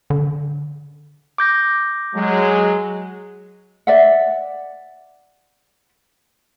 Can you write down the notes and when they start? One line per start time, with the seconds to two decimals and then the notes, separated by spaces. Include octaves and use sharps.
0.10 D3
1.38 D6 G6 A#6
2.15 F#3 G#3
3.87 D5 E5 F#5